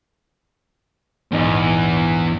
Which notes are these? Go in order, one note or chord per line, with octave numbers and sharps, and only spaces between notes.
A#1 E2 G#2 D#5